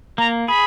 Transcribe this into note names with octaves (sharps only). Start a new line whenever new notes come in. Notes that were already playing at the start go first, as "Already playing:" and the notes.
A#3 A#5
G#4 B5